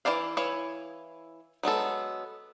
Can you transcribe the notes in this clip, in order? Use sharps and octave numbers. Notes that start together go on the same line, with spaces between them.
E3 D#4 E4 D5 F5
E3 E4 C#5 F5
F#3 G#3 B3 A4